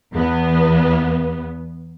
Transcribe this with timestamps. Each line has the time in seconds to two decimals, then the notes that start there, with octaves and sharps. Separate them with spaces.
0.12 E2 B3